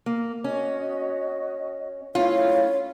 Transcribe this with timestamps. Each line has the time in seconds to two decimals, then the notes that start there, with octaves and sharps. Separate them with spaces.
0.06 A#3
0.44 C#4 F#4 D#5
2.15 A3 C#4 E4 F4 C#5 F5